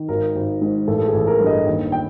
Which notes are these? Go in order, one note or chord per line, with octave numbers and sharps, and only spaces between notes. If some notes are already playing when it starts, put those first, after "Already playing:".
Already playing: D#3
G#1 A#4
G#1
G#2
A1 A4
A4
G#4
A1
A#4
G2
D#5
D#2
G5